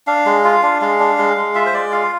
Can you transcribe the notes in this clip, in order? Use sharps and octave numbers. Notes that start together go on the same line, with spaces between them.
D4 F5
G#3
F4
D4
G#3 F5
D4
G#3
G#3
F4 E5
C5
G#3 D5
F4 F5